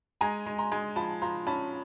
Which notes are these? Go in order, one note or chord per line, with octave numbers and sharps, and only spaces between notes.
G#3 G#5 A#5
G#3
A#5 C6
G#3
F3 A5 B5
F3 A#5 C6
C#4 A5 B5